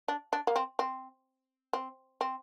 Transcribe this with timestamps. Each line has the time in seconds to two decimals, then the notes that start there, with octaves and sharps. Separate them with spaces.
0.08 D4
0.33 D4
0.47 A#3
0.56 C4
0.79 C4
1.73 C4
2.21 C4